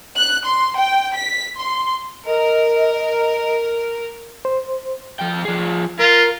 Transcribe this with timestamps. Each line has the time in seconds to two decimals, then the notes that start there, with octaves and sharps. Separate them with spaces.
0.17 F#6
0.47 C6
0.79 G5
1.18 B6
1.59 C6
2.25 A#4 D#5
4.45 C5
5.20 F3 G5
5.45 F3 G#4
5.99 F4 A#4